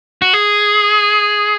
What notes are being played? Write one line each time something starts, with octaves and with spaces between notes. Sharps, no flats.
F#4
G#4